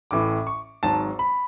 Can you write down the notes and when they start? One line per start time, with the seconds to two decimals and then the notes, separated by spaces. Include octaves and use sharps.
0.11 A1 A2 E3 D6
0.47 C#6
0.83 G#1 G#2 F#3 A5
1.19 B5